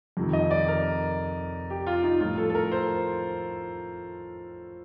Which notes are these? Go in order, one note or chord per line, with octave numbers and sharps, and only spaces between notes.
F2 C3 D#3
D#5
D5
A#4
G4
F4
D#4
A2 F3 F4
A4
A4
A#4
C5